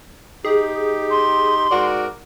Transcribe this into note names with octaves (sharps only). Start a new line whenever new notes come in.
D#4 G4 G#4
C6
G#2 F#4 A#4 D5